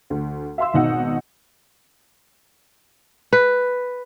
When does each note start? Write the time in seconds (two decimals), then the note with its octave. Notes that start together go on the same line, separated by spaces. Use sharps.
0.10 D2
0.58 E5 F5 C6 E6
0.74 G#1 B2 D#4 F#5
3.33 B4